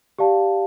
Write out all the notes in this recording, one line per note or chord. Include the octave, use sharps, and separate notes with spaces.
G4 D5 F5 A5